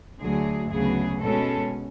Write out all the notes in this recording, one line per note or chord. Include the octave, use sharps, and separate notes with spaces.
D2 D3 F#3 G#4
D2 C#3 F#3 B3 G#4
B2 G#3 C#4 A4